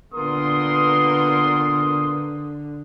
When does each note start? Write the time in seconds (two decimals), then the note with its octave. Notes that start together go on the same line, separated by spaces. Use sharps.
0.14 A#2 D3 B3 A#4 C6 D#6